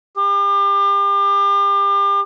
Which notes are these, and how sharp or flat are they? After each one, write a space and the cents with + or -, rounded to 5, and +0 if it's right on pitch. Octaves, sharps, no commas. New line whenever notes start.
G4 +35